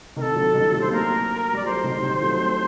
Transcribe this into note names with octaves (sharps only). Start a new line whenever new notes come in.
C3 D#3 A#4
A4
D3 F#3
D#3 G3
G3
F#3 A3
C5
G3 A#3 A#4
G3 D5
F#3 A3 C5
D#3 G3
D#3 G3
F#3 A3
A3 C4